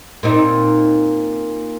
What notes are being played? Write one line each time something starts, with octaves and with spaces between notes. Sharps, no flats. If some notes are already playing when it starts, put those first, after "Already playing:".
A#2 C4 D#4